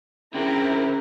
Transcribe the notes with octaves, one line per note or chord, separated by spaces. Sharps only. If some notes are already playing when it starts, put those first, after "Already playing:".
D3 C4 C#4 E4 G#4 A#4